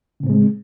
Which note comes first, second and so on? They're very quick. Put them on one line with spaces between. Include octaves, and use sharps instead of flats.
C#3 A2 C4 G#3